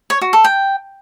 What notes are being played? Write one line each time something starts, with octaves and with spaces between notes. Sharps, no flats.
C#5
F#4
A4
G5